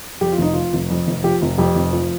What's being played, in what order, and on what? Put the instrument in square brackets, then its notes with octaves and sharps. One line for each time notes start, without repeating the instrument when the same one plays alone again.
[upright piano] F2 G4
F4
F1 D#4
F3 F4
F1
F2
F1
F3 G4
F1
F2 G4
F1
F3